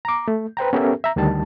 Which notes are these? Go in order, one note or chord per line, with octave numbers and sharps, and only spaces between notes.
A#5 D6
A3
B4 C5 G5 A#5
B3 C#4 G4 A4 A#4 E5
E5 A#5
D2 D#3 G3 A5